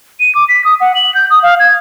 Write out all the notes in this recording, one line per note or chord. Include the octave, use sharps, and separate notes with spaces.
D#7
D6
B6
D#6
F#5
F#7
G6
D#6
F5
G#6